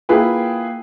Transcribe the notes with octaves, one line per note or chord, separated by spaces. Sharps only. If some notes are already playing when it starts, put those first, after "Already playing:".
A#3 E4 F4 G#4 B4 G5